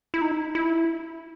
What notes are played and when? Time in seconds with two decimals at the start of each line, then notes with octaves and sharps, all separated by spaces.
0.14 E4
0.22 D#4
0.55 E4